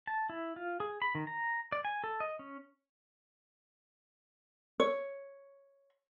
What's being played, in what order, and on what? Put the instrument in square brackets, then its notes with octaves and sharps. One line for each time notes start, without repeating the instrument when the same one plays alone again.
[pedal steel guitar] A5
E4
F4
G#4
B5
D#3
A#5
D5
G#5
A4
D#5
C#4
[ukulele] C#5